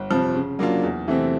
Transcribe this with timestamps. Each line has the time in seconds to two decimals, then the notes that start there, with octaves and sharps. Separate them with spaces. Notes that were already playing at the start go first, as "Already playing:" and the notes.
Already playing: G1
0.11 F2 C3 F3
0.35 C#3
0.59 F#3 A#3 D4 F4
0.83 E2
1.07 C3 E3 A3 C4